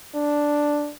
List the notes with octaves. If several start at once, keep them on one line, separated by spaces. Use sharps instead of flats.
D4